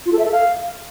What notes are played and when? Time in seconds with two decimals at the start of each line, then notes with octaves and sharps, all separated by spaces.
0.06 F4
0.12 A4
0.19 E5
0.26 A4
0.32 F5